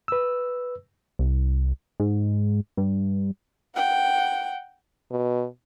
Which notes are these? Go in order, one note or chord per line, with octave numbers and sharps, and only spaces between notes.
B4 E6
C2
G#2
G2
F#5 G5
B2